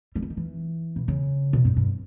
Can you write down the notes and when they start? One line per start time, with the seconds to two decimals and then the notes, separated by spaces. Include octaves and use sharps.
0.15 G3
0.22 E3
0.30 D#3
0.37 E3
0.96 B2
1.08 C#3
1.53 B2
1.65 G2
1.76 G2